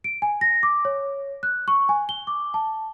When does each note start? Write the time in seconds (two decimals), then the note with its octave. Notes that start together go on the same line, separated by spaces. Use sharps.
0.04 D7
0.22 G#5
0.41 A#6
0.63 D6
0.85 C#5
1.43 F#6
1.68 C#6
1.89 G#5
2.09 G7
2.27 D6
2.54 A5